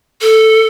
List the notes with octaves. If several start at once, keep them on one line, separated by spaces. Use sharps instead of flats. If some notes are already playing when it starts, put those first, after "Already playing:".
A4